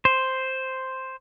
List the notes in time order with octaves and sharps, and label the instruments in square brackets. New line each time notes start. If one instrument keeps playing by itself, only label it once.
[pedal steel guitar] C5